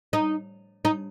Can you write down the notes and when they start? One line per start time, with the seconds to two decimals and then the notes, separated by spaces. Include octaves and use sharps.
0.13 D#4
0.85 D#4